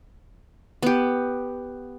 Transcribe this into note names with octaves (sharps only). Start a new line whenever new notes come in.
B3 G4